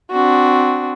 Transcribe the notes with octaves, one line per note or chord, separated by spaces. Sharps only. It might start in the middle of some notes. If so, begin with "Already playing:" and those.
C4 D4 F#4